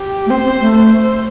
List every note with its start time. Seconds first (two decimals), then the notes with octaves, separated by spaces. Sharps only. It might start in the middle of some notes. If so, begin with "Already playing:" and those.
Already playing: G4
0.25 A3
0.30 C4 C5
0.44 C4
0.59 A3
0.75 C5